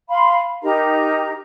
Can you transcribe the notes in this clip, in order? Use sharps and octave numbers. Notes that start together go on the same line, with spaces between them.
F5 B5 C6
D#4 G4 A#4 A#5